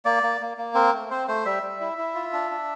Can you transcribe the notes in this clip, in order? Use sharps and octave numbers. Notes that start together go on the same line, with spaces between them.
A#3 D5
A#3
A#3
A#3
C4 A#4
A3
C4 C5
A3 C5
G3 E5
G3
E4
E4
F4
D4
D4